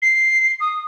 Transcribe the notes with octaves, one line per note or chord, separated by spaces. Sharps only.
C7
D#6